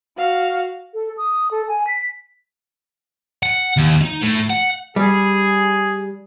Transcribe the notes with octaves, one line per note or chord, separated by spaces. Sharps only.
F#4 F5
A4
D#6
A4
G#5
B6
F#5
D#2
D#4
A2
F#5
G3 G#4